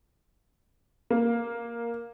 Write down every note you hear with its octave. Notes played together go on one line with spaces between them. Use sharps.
A#3